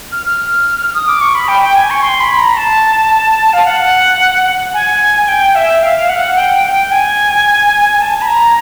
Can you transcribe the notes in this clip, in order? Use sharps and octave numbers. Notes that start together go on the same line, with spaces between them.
F6
F6
D#6
D6
C#6
B5
G5
G5
G#5
C#6
C6
B5
A#5
A5
F5
F#5
G#5
G5
E5
F5
F#5
G5
G5
G5
G#5
A5
B5
A#5